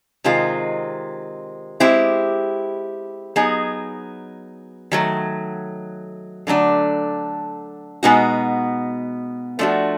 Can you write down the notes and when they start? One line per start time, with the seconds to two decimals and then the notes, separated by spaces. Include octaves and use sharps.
0.24 C3 D#3 G#3 C4 F4
1.80 G#3 C4 E4 G4
3.36 F#3 B3 D#4 G#4
4.92 D#3 F#3 A3
6.47 D3 F#3 A3 D4
8.03 B2 G#3 B3 D#4 F#4
9.59 F3 A3 D4 F#4